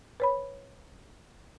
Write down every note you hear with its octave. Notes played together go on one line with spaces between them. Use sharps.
B4 C#5 B5